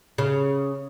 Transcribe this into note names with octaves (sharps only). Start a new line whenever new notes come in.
C#3